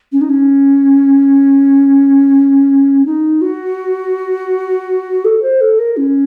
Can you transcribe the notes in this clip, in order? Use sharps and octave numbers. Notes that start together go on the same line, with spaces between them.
C#4
D#4
C#4
D#4
F#4
A4
C5
A4
A#4
C#4